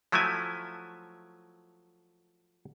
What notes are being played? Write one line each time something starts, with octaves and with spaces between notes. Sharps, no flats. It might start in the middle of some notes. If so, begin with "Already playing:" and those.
F3 F#3 A3 E4 G#5